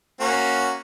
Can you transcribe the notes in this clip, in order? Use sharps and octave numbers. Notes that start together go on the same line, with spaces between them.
A#3 C#4 F#4